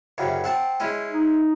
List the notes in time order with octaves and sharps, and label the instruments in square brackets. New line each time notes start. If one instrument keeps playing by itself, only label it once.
[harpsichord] C2 F#2 C#3
C4 F#5 A5
G#3 C#4 E4
[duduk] D#4